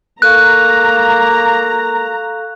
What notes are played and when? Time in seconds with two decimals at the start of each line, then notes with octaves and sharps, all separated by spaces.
0.22 A#3 A4 F5 A#5 C#6 F#6